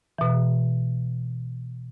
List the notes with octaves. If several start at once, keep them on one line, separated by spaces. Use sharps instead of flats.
B2 E3